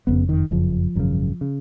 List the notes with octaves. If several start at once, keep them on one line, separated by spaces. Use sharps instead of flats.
F#1 F2 C#3 B3
D#3
F#1 F2 C#3 F3
G#1 F#2 C#3
C#3